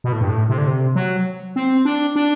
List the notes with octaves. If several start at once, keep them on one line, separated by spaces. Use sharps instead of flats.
B2
A2
G2
A2
C3
D3
C3
F#3
C4
D4
D4